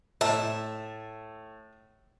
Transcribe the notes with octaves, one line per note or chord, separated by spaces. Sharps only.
A2 E5 A5